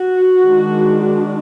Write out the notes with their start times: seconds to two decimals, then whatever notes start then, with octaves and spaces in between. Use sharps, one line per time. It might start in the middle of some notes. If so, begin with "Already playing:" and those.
Already playing: F#4
0.45 D#3 G#3 D4